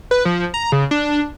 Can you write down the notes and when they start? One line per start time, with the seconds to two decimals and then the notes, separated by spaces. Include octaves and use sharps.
0.11 B4
0.25 F3
0.54 A#5
0.72 C#3
0.91 D4